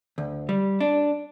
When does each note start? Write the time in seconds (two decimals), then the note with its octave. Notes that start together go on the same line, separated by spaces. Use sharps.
0.18 D2
0.49 G3
0.81 D4